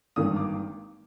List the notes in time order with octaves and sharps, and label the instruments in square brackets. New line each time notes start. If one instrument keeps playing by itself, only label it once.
[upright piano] G#1 G2 D#3 A#3 D#6
D6